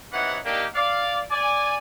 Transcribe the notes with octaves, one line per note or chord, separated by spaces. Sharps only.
C3 E3 D#4 C#5 F#5
A#3 D4 D#4 G4
D5 F5
D5 G#5